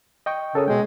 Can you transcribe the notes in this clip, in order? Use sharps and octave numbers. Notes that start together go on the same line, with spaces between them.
D#5 G5 C#6
C#3 A4 A#4 D#6
B2 G#3 G5